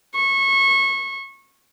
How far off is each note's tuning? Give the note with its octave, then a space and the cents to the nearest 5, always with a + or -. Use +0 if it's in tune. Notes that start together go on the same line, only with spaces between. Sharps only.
C#6 -25